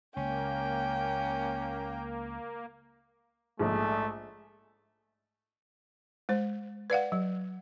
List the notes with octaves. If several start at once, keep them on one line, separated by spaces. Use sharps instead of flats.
C#2 A#3 C#4 G5
A#1 G#2 A3
G#3 C5
B4 D5 F5 F#5
F#3